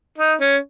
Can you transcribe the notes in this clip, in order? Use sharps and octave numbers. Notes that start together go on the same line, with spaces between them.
D#4
C#4